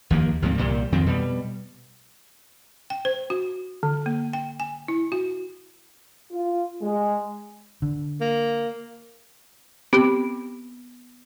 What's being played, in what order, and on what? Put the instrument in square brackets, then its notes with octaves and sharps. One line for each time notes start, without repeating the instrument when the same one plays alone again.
[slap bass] D#2 F3 A#3
D2 G#2 F3 C4
C2 A#2 G3
F2 D#3 C4
B2 G3
[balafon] G5
C5
F#4
D3
A#3
G5
G#5
E4
F#4
[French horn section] F4
G#3
[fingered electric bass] D3
[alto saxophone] A#3
[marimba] B3 [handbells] C4 G4